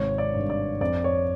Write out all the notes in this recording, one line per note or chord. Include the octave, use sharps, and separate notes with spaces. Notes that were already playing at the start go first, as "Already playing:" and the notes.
Already playing: G#1 C3 C#5
D5
G2
D5
F2 D5
C#5